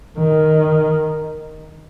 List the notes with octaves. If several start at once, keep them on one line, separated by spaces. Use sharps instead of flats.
D#3